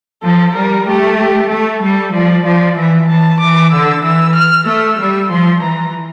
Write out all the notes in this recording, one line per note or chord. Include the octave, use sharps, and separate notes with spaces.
F3 A4
G3 A#4
A3 G4
G4
A3 A4
G3 A4
F3 D5
F3 D5
E3 E5
E3 A5
E3 D6
D3 E6
E3 E6
F6
A3 E6
G3
F3 C6
E3 A#5